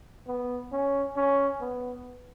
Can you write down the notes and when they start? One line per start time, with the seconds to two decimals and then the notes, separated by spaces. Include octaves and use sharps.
0.27 B3
0.72 C#4
1.16 C#4
1.61 B3